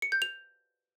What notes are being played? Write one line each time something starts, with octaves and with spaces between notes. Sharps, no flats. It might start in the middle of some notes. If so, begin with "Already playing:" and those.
C#7
G6
F7